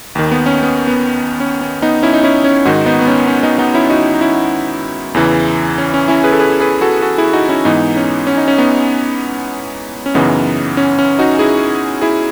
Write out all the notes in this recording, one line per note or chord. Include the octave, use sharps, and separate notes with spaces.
D#2 D#3
B3
C#4
B3
B3
C#4
C#4
B3 D#4
C#4 E4
D#4
C#4 E4
C#4
G#2 D#3 D#4 F#4
B3 D#4
B3
C#4
C#4
B3 D#4
B3 D#4
C#4 E4
D#4 F#4
D#4
C#4 E4
E2 C#3 E3
C#4
C#4
C#4 E4
G#4 B4
A4
G#4 B4
G#4 B4
F#4 A4
F#4 A4
E4 G#4
D#4 F#4
C#4 E4
G#2 E3 B3 D#4
C#4
C#4
D#4
C#4
B3 D#4
C#4
F#2 C#3 E3 B3 D#4
C#4
C#4
D#4 F#4
E4 G#4
E4 G#4